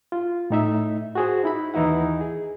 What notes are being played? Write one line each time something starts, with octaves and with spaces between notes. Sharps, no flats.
F4
A2 D#4 E5
F#4 G#4 C5
D#4 E4 B5
D#2 E3 D#4 E4 F#5
G#4